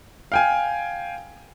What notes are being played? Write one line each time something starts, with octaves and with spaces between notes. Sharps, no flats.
F5 G5 G#5